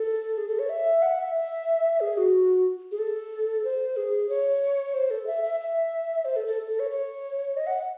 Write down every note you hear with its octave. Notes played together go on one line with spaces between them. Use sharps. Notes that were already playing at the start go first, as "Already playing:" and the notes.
Already playing: A4
G#4
A4
C#5
E5
F#5
E5
E5
G#4
F#4
G#4
A4
C5
G#4
C#5
C5
A4
E5
E5
E5
C5
A4
A4
A4
C#5
C#5
D#5
F#5